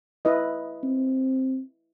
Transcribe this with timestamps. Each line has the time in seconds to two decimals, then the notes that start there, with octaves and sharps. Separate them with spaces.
0.25 E4 B4 D#5
0.83 C4